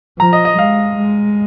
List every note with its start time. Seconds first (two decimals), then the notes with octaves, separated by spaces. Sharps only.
0.19 F3 A#5
0.33 D#5
0.45 D#5
0.58 G#3 F5
0.98 G#3